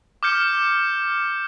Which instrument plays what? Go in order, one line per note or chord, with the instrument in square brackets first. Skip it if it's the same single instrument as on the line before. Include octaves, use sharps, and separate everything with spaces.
[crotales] D6 F6 G6 C#7